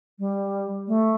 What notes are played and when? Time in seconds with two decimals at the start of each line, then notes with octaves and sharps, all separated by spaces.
0.19 G3
0.87 A3